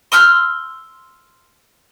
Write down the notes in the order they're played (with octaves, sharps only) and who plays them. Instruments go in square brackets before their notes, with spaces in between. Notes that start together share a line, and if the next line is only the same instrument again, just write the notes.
[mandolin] C6 E6 F6 G6